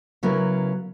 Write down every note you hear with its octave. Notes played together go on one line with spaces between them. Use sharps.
C#3 F#3 B3 E4 A#4